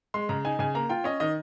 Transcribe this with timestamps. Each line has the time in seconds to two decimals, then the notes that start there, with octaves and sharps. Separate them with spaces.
0.14 G#3 C6
0.29 C#3 A#5
0.44 D#4 G#5
0.59 C#3 G#5
0.74 A#3 A#5
0.89 F4 G5
1.04 C#4 D#5
1.20 D#3 D#5